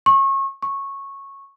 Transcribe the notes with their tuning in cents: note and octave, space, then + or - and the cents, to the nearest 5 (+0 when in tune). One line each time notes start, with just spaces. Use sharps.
C#6 -30
C#6 -10